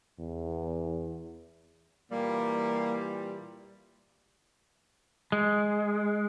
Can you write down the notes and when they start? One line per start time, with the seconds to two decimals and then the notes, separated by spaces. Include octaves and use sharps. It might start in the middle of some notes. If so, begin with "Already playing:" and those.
0.19 E2
2.12 A#2 E3 G3 A#3
5.32 G#3